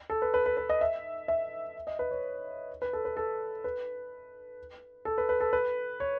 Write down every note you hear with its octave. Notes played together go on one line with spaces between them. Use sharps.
A4
B4
B4
B4
B4
D#5
E5
E5
D#5
B4
C#5
B4
A4
B4
A4
B4
A4
B4
B4
A4
B4
C#5